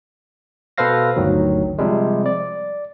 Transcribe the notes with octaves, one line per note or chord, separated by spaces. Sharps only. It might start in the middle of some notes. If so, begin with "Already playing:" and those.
B2 A4 B4 C5 F5 A#6
G1 D2 D#3 F#3
C3 F3 G3 G#3
D5